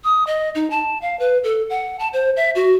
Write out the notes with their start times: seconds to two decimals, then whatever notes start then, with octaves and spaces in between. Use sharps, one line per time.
0.04 D#6
0.27 D#5
0.55 D#4
0.70 A5
1.02 F5
1.19 B4
1.44 A4
1.70 F#5
1.99 A5
2.13 C5
2.37 E5
2.55 F#4